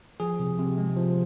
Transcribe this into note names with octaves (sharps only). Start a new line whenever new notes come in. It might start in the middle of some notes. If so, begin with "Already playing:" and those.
F3 G#4
C3
C3
G#3
F3